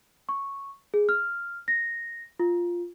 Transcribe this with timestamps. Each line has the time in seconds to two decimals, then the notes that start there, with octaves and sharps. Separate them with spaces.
0.29 C#6
0.94 G#4
1.09 F6
1.68 A#6
2.40 F4